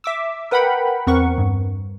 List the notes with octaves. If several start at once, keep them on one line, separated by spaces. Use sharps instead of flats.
E5 D6 E6
A#4 B4 F#5 G5 B5
E2 C4 A#4 F#5 C#6
G2